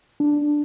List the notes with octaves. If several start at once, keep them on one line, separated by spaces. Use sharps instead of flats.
D4